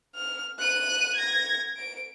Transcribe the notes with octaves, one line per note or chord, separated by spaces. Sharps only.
F6
F#6 D#7
G#6 A#6
D7